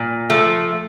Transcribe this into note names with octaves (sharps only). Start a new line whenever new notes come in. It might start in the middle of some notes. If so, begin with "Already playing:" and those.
Already playing: A#2
F3 A3